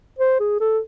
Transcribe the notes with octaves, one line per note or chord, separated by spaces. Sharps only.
C5
G#4
A4